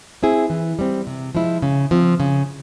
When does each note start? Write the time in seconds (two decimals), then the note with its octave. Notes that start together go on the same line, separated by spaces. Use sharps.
0.23 C4 E4 G#4
0.50 E3
0.79 G3 C4
1.07 C3
1.35 F3 G#3 E4
1.62 C#3
1.91 F3 C4
2.20 C#3